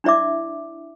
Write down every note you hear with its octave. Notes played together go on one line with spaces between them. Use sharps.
D4 E4 D5 E5 D6